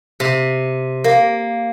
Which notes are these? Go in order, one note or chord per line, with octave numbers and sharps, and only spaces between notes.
C3
A#3